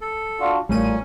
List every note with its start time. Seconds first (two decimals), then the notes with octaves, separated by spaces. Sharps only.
0.01 A4
0.40 D4 F4 F#4
0.69 A1 A#2 G3 A3 C#4 D#7